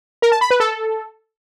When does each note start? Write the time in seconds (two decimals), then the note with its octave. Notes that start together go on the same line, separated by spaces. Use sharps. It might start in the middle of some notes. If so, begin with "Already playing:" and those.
0.22 A#4
0.32 A5
0.41 B5
0.51 B4
0.60 A4